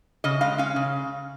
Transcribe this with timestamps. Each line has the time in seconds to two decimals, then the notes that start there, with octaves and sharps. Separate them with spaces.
0.24 C#3 D#5
0.41 G#3 F5
0.58 C#4 F5
0.76 C#3